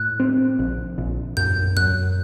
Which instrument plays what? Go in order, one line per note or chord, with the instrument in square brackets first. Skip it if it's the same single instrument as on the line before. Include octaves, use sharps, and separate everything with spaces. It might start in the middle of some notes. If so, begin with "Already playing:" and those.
Already playing: [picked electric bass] A2 [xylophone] F#6
[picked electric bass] C4
A#1
A#1
[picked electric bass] F#2 [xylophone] G6
[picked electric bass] F#2 [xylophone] F#6